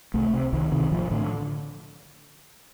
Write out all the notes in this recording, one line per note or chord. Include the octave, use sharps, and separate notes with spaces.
C2 A3
C3
C2 D#3
C3 D#3
A1 F3
A2 D3